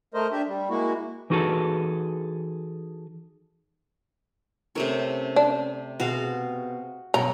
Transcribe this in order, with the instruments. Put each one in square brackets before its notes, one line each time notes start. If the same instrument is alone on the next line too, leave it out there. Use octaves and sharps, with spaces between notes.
[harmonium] A3 A#4 C5 D#5
D4 G4 E5
G3
G#3 A#3 E4 F#4
[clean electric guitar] E3 D#4 F#4 G#4 A4
[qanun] C3 A3 C#5 [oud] C#4 E4 A#4
[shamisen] D4
[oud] B2 C4 G#4 [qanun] F#4 F5
[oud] G2 B2 F#3 [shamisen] A#5